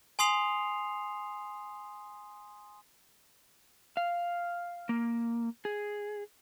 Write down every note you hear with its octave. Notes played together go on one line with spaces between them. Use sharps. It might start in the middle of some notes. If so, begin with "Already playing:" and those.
G#5 C6 D#6 C7 F7
F5
A#3
G#4